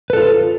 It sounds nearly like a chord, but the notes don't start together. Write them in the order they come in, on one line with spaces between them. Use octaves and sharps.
B4 A4 F4